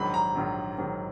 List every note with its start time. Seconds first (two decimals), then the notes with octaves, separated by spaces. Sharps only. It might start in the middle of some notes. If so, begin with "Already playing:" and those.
Already playing: A#1 G#2 D#3 F#3 B5
0.14 A#5
0.35 A#1 G#2 D#3 F#3
0.77 A#1 G#2 D#3 F#3